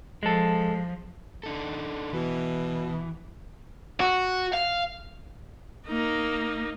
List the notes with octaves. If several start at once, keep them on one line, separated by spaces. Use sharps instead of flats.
F3 G#3 A4
D4 D#4 A4
B2 E3
F#4
F5
A#3 D#4